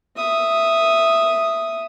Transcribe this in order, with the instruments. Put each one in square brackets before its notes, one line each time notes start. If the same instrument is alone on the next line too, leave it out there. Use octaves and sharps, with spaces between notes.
[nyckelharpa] E5 D#6